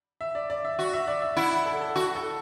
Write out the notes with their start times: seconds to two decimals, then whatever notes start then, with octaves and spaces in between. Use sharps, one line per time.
0.21 E5
0.35 D5
0.50 D5
0.65 E5
0.79 F#4
0.93 E5
1.07 D5
1.22 E5
1.37 E4 F#5
1.51 F#5
1.66 A4
1.81 A4
1.96 F#4
2.15 A4